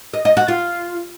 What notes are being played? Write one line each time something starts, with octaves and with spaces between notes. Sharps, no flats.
D#5
D#5
F#4
F4